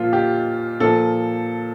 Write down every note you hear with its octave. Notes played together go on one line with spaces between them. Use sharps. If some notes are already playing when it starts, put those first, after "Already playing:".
Already playing: A#2 F3 F4
G4
A#2 F3 A4